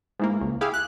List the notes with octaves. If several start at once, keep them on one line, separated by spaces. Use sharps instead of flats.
G#2 E3 A#3
C#2
E4 G4 G#4 F5
F#6